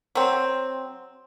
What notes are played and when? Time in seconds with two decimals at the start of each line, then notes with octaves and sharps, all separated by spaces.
0.15 F#3 C4